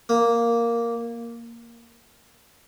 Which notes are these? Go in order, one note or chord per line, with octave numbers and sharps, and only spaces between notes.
A#3